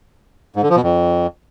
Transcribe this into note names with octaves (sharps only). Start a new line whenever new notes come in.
G#2
D3
F3
B2
F2